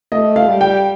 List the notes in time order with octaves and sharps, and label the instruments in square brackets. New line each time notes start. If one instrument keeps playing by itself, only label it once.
[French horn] A3 [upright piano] D#5
[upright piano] F5
[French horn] G3
[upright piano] G5